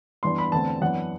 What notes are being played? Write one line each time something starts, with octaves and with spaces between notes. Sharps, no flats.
G2 E3 B3 D4 C6
B5
E2 D3 A3 C4 A5
F#2 E3 B3 D4 F#5